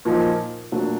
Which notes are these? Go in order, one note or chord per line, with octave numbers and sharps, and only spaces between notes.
A#2 F3 A#3 D#4
A#2 F#3 A3 D4